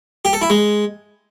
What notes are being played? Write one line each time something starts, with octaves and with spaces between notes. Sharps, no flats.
G4
A4
E4
G#3